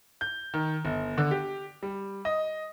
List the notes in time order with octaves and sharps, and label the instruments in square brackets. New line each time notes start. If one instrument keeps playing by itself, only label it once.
[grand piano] G6
D#3
G1
D3
G4
G3
D#5